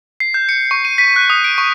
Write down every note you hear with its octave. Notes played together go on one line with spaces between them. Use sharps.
C7
G6
C#7
C#6
D#7
B6
F#6
D#6
D7
C#6